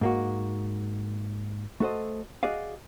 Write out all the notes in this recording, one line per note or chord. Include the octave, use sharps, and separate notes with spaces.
G#2 A#3 F#4
A3 F#4 A4 C5 D#5
F#4 G#4 D5 D#5 F5